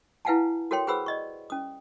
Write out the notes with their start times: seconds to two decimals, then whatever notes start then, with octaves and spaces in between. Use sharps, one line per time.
0.25 E4 B4 F5 F#5 G#5 A5
0.71 F#4 A4 A#4 C#5 G5 C6
0.87 G#4 B4 C5 F#5 B5 E6
1.06 D5 D#5 C#6
1.50 C#4 D#6